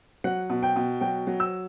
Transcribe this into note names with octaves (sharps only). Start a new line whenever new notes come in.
F#3 F#5
B2
G5
B2
F#3 G5
F#3
E6